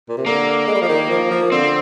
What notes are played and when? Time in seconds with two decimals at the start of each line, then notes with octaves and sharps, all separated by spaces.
0.09 A#2
0.17 C3
0.26 D3 A#3
0.67 G#3
0.74 G3
0.82 F3
0.89 D#3
1.10 F3
1.31 F3
1.52 D3 C4